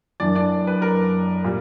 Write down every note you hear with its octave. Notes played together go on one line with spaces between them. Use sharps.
F#1 F#2 E3 D4 D5
D4 D5
B4
A#4
A#2 G3